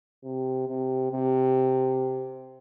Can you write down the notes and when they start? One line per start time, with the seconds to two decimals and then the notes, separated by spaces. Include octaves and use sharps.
0.24 C3
0.68 C3
1.12 C3